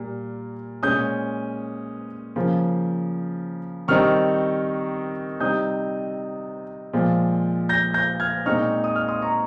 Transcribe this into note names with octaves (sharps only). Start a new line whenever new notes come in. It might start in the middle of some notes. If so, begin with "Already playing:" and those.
Already playing: A#2 G3 A#3
A#2 G#3 C#4 D#6 G6
C#3 F3 A#3
D#3 G3 C4 D#4 C#6 F6
C3 G3 C4 D#4 D#6 G6
A#2 F3 G#3
G6 A#6
G6 A#6
F6 G#6
A#2 G#3 C4 D#4 C#6 F6
D#6
F6
C6 D#6
A#5 C#6